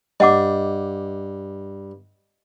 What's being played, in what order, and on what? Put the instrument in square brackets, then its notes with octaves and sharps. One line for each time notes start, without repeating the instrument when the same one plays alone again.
[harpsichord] G2 [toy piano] D#5 F#5 D6